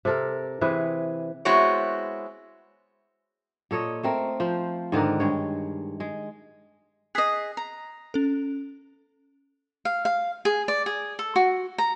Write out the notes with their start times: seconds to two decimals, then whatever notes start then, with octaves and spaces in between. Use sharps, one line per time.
0.05 C3 A4 A#4
0.61 C3 E3 G#4 B4
1.45 G#3 B3 C4 E4 F#4 C#5
3.71 A#2 A4 C#5 D#5
4.03 A3 C4 A#4
4.40 F3 C5
4.92 G#2 D3 D#3 A#4
5.20 G2 G#3 C#5
6.00 G#3
7.15 G#4 D#5 F#6 B6 C7
7.57 A#5
8.14 C#4 A4
9.85 F5
10.05 F5
10.45 G#4
10.68 D5
10.86 G#4
11.19 A4
11.36 F#4
11.78 A#5